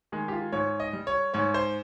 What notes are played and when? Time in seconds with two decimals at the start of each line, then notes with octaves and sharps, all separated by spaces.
0.12 D#3 G#3
0.28 G4
0.32 F4
0.52 G#2 C#5
0.80 D#5
0.93 G3
1.07 C#5
1.34 G#2 C#5
1.54 C5